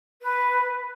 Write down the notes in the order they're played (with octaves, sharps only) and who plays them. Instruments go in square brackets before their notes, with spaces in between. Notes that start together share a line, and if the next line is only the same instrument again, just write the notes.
[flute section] B4